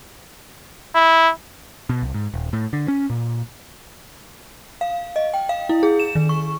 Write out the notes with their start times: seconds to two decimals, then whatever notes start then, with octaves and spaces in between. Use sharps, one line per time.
0.95 E4
1.89 B2
2.02 C2
2.14 G#2
2.34 D#1
2.53 A2
2.73 D3
2.88 C#4
3.10 A#2
4.81 F5
5.16 D#5
5.34 G5
5.49 F5
5.69 E4
5.83 G#4
5.99 E7
6.15 D#3
6.29 C#6